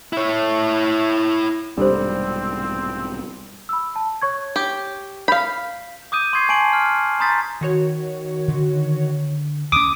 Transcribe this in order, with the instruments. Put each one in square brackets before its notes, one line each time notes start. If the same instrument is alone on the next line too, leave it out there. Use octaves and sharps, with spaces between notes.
[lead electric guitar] E4 C#5
[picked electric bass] B1 G#2 C3 [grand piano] G3 [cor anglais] C4 [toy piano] D4 A4 C5
[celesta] B5 E6
A5
C#5 C#6 G#6
[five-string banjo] G4
[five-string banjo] F5 B5 [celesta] G6 B6
[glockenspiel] D6 D#6 G6 D#7
C6 C#6 D#6 G#6 C7
G#5 A5 D7 F#7
F6
A#5 C6 D#6 G6 A6 B6
[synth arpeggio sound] D#3 F#4 C#5
[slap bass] D3
[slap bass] D2 C#4 [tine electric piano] D6 D#6